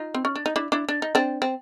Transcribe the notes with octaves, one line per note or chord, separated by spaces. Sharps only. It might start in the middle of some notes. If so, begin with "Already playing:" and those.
Already playing: D#4 F4
C4
C#4
D4
D#4
D4 E4
D4 E4
D4
D#4
C4 D4
C4